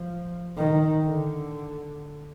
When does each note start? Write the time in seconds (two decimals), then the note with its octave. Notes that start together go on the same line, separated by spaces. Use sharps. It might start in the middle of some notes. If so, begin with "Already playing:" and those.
Already playing: F3
0.57 D#3
1.03 D3